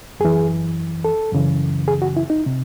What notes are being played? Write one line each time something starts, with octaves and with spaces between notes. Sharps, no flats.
F#2 E3 G#4
A4
F#2 C#3 E3
G#4
F#4
E4
D#4
C3